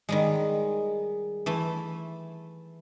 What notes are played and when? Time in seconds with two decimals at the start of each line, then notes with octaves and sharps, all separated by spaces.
0.09 D#3 G3 G#3
1.46 E3 A3